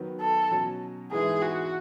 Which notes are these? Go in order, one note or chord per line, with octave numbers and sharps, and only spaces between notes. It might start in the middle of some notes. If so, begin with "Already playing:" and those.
Already playing: D#3 F#3 B3
A4
B2 F#3 C#4
G#2 E3 G#3 B3 E4 G#4
F#4